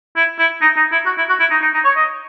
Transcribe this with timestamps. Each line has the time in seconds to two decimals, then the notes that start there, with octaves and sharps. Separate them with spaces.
0.16 E4
0.39 E4
0.61 D#4
0.76 D#4
0.92 E4
1.06 F#4
1.17 E4
1.29 F#4
1.40 E4
1.50 D#4
1.62 D#4
1.74 D#4
1.84 C#5
1.96 D#5